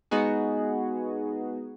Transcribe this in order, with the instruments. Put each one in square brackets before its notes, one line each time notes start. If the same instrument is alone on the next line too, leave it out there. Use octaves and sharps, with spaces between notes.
[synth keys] G#3 B3 D#4 F#4 G#4